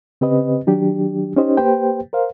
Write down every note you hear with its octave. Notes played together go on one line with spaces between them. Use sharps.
C#3 C4 G4 B4 D#5
D#3 F#3 D4 G4
C#4 D#4 G4 C5 D#5
A#3 G4 B4 C5 G5
A#4 C5 F5